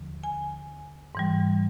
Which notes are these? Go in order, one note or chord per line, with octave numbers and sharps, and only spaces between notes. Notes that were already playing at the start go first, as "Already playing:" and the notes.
Already playing: D#2 D3 F3
G#5
G#2 E3 G3